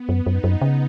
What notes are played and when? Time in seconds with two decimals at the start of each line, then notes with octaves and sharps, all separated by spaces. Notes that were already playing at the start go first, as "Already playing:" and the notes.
Already playing: B3
0.09 F#2
0.26 F#2 D#4
0.44 F#2
0.61 C#3